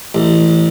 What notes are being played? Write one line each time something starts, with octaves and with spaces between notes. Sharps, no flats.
A1